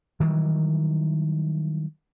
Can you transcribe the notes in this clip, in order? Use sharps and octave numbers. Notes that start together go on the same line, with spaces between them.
D#3 E3 F#3 G3